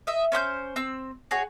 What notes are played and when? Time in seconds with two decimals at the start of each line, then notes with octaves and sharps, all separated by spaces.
0.07 D#5 E5
0.32 C#4 C5 B5 G6
0.76 C4 E6
1.31 F#4 G#4 C#5